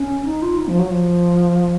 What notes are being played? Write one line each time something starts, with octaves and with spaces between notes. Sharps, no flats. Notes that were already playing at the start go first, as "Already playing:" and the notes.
Already playing: C#4
D#4
F4
D#4
F3
F#3
F3